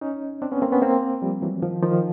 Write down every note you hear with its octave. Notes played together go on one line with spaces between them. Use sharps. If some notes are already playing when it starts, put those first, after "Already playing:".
C#4 D#4
C4 D4
B3 C#4
A#3 C4
B3 C#4
A#3 C4
F3 G3
E3 F#3
D#3 F3
D#3 F3